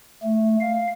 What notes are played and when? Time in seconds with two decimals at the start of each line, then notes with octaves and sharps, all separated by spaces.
0.23 A3
0.61 F5